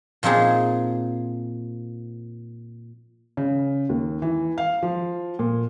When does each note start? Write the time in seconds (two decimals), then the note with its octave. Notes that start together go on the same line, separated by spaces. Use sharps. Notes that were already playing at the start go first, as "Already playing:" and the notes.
0.23 A#2 F3 C4 D#4 G#4
3.37 C#3
3.89 D#2
4.22 E3
4.58 F5
4.83 F3
5.39 A#2